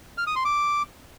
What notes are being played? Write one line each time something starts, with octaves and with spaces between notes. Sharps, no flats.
F6
D#6
C6
D6